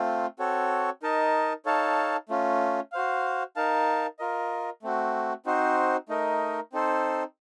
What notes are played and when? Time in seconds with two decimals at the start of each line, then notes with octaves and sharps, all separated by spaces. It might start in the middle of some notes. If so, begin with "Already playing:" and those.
Already playing: A3 C4 F4
0.39 C4 F#4 A4 C#5
1.03 D#4 A#4 D#5 A5
1.66 D#4 A4 C#5 F5 A5
2.29 A3 C#4 F4
2.92 F#4 C5 F5
3.56 D#4 A#4 F5 A5
4.19 F4 A#4 D#5
4.83 A3 C4 F#4
5.46 C4 D#4 F#4 C5
6.09 A3 D#4 A#4 D#5
6.73 C4 D#4 A4 C5